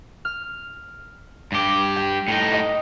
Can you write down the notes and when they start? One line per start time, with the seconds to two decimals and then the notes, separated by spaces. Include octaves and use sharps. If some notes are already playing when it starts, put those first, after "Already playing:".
0.25 F6
1.52 G2 G4
1.96 G5
2.28 A2 D#4
2.53 D#5